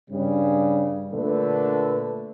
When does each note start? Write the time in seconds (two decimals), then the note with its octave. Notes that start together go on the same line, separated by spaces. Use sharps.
0.10 G2 C#3 G3
1.13 A#2 D3 A3 B4